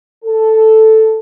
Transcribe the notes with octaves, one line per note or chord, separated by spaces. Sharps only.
A4